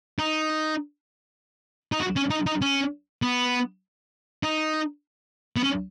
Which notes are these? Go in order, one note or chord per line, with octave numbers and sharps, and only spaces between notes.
D#4
D#4
F#4
C#4
D#4
D#4
C#4
B3
D#4
B3
C#4